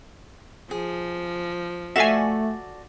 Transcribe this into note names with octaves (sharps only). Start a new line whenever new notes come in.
F3 G#4
A3 F#4 A4 D5 E5 F5 G#5